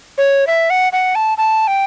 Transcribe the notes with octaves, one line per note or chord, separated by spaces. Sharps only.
C#5
E5
F#5
F#5
A5
A5
G5